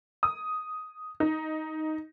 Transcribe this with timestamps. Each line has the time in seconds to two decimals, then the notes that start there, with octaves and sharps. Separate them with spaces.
0.23 D#6
1.20 D#4